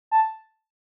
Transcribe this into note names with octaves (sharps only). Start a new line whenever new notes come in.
A5